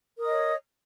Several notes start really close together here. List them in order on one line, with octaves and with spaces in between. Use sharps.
A#4 D#6 D#5 C#5